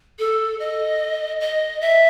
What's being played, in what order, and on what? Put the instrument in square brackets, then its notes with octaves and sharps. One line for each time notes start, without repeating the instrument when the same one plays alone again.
[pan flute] A4
D#5
D#5
E5